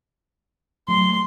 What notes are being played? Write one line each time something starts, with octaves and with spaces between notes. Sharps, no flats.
F#3 A3 C6